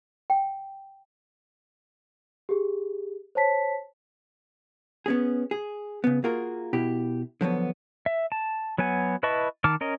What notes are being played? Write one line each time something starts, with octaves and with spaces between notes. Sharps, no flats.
G5
G4 G#4
C5 C#5 A5 B6
B3 C#4 G#4
G#4
C#3 B3
A#3 F4 F#4 G#4 A#4
B2 E4 G4
D3 F3 F#3 B3
E5
A5
F#3 B3 F#4 G#5
E4 B4 D#5 A5 C#6
D#3 A5 D6 F6
C#4 A#4 D#5